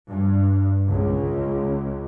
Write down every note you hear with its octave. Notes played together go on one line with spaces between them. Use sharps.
G2
C#2